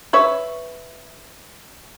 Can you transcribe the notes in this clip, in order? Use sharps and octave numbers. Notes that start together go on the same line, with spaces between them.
B4 C#5 E5